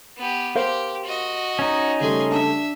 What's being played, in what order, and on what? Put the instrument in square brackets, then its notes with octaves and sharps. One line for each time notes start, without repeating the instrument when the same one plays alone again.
[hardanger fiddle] B3 G4
[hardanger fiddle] G4 [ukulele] A#4 C5 F5
[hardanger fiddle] F#4 D#5
[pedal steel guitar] C#4 D#4
[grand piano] C#3 G3 A3 [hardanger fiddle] G#4 C6
[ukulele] D4 [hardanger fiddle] E5